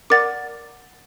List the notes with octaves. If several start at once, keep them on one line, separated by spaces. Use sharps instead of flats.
A#4 D5 F#5 D6 A6